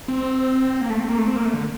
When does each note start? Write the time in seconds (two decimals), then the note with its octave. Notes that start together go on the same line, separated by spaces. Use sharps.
0.08 C4
0.81 A#3
0.90 A3
1.00 C4
1.04 A3
1.09 A#3
1.18 A3
1.27 C4
1.36 A#3
1.45 A3
1.54 D3